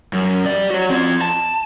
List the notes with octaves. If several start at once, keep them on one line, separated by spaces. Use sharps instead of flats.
F#2
G3 D5
F#4 C#5
C4 F4
A5